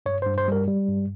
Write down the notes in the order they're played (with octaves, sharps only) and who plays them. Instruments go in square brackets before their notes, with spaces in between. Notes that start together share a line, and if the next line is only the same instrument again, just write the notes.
[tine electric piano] G2 C#5
G2 C5
C5
G3 A#4
G3
G2